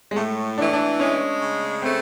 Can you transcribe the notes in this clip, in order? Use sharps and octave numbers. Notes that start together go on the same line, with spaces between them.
G#3
A2 A3
E3 D4
D4
G#3 C#4
C#3
A3 C4